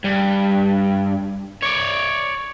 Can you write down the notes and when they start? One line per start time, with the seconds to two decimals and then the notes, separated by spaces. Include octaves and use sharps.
0.04 G2
1.62 C#5 D5